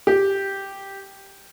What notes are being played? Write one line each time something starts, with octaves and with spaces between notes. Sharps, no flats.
G4